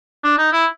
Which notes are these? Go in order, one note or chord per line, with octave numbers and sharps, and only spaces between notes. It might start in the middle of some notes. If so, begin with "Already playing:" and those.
D4
D#4
E4